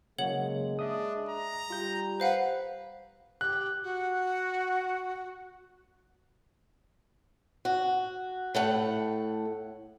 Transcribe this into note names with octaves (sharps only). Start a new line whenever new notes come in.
C#3 F#3 G#3 A#3 C#5 F#5 F#7
D4 E5 D#6
A#5
G3 F4 G6
B4 C5 F5 F#5
G4 F#6
F#4
F#4
A2 A3 F#5